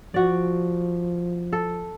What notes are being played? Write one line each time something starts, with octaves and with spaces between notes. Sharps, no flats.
F3 F#4 D5
A4